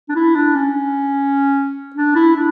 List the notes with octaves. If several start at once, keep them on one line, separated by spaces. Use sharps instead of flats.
D4
E4
D4
C#4
D4
E4
D4